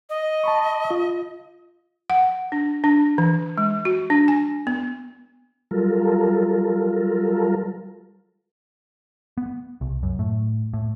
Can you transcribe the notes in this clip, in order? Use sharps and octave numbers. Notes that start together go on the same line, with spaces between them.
D#5
A5 B5 C#6
F4
F#5
D4
D4
E3
G#3
F#4
D4
G#5
B3
F#3 G3 F4 A4 A#4
B3
C2
F#2
A2
A2